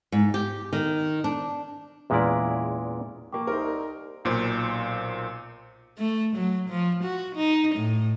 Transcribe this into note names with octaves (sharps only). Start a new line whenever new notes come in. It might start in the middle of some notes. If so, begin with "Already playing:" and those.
G#2
G4
D#3
D4
E2 A#2 G#3 C#4 E4 D5
F3 A#3 G5 C#6 D6
C2 D#4 A#4 C5
B1 A#2 C5
A3
F#3
F3
F#4
D#4
A2